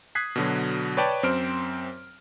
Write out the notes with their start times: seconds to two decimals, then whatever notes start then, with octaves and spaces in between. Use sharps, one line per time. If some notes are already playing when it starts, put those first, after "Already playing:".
0.15 D#6 F#6 G#6 B6 C7
0.36 B2 D3 F#3
0.97 B4 C#5 D5 G5 A5
1.23 F#2 C4 C5 F6 D7